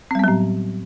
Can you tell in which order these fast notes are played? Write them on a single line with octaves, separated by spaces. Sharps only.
C4 G3 B3 F#3 A2